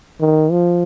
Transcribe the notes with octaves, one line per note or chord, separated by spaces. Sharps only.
D#3
F3